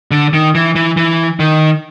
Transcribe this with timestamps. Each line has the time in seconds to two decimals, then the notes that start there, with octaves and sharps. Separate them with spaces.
0.11 D3
0.33 D#3
0.55 E3
0.76 E3
0.97 E3
1.40 D#3